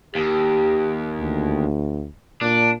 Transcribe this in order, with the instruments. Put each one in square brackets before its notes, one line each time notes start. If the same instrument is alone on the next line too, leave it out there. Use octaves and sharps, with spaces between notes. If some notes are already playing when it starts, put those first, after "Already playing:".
[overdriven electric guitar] D#2 [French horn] G4
[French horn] D2
[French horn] A#2 [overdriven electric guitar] D4